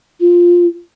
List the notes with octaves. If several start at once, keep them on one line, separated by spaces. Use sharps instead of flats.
F4